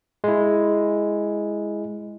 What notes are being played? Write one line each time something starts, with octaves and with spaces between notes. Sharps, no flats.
G#3 E4